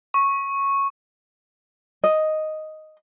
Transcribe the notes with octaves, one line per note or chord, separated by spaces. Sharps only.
C#6
D#5